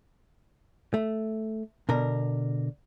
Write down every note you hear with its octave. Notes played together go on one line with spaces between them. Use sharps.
A3
B2 D3 A#4